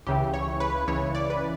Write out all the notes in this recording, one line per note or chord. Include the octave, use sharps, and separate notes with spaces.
C#2 C#3 E3 G4
C#5
B4
C#2 C#3 E3 C#5
D5
B4